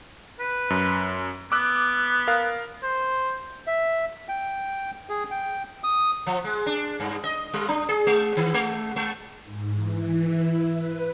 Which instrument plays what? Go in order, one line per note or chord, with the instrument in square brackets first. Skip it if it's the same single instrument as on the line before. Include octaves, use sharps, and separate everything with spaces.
[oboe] B4
[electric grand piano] F#2
[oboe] B3 [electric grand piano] D6 E6 F#6
[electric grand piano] A#4 F5
[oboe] C5
[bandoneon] E5
G5
G#4
G5
D#6
[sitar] F3
G#3
D4
G2
D#5
G3
D4
G#4
G#3
D#3
G#3
G#3
[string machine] G#2
E3
E4
B4